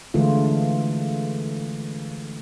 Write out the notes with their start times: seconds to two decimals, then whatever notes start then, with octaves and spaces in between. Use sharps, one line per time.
0.14 D3 E3 G#3 A3 F4